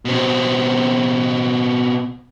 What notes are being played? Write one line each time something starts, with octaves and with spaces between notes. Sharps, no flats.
B2 C4